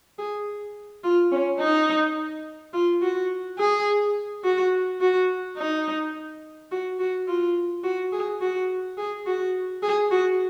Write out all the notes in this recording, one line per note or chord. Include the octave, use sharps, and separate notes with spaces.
G#4
F4
C#4
D#4
F4
F#4
G#4
F#4
F#4
D#4
F#4
F#4
F4
F#4
G#4
F#4
G#4
F#4
G#4
F#4